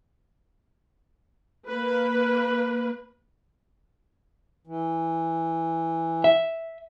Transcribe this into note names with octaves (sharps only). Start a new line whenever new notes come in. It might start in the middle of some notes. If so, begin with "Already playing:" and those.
A#3 B4
E3
E5